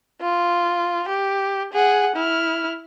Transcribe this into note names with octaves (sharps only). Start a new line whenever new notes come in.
F4
G4
G#4 F#5
E4 F6